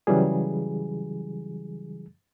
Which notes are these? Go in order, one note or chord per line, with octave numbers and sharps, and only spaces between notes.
C#3 E3 F#3 G3 G#4